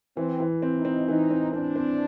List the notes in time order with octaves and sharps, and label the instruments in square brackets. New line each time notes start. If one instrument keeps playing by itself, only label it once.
[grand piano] E3 [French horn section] C4
[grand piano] E3
C4
[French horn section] D#4
[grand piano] C4
[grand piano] E3 [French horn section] D#4
[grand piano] C4
[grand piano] C4 [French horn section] D4
[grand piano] C4